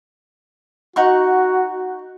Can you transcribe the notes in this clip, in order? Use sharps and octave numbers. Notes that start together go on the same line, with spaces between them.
D#4 F#4 F#5 C#6